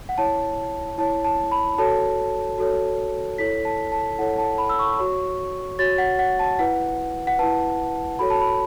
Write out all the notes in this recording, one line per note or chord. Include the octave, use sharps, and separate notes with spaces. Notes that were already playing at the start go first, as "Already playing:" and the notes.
F#5
E4 C#5 A5
E4 C#5 A5
A5
B5
F#4 A4 C#5 A5
F#4 A4 C#5
E4 A4 C#5 B6
A5
A5
E4 A4 C#5 F#5
A5
B5
E6
C#6
F#4 C#5
F#4 C#5 A6
F#5
F#5
A5
E4 B4 F#5
F#5
E4 B4 A5
F#4 A4 C#5 B5
A5
B5